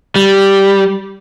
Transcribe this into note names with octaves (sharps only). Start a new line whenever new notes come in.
G3